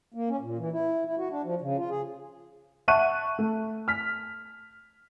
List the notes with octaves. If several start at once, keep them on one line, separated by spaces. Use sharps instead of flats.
A#3
C#4
A#2
E3
E4
E4
F#4
D4
F3
C#3
F4
G#4
E5 F#5 A5 C#6 F#6 D#7
A3
F6 B6